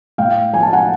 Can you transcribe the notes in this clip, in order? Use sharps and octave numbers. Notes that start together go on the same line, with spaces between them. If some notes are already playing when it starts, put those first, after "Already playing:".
A2 F5 G5
F3 A3 G#5
A5
F#5 G#5